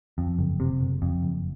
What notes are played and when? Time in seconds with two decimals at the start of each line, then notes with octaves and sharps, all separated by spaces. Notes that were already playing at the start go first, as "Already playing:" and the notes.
0.18 F2
0.39 F#1
0.60 C3
0.81 F#1
1.02 F2
1.22 F#1